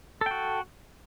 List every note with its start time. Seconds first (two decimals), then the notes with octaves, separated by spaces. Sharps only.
0.21 A4
0.26 G5
0.31 F#4